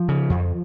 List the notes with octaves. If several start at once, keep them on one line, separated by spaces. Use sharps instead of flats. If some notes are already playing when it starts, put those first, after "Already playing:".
Already playing: F3
C#3
F2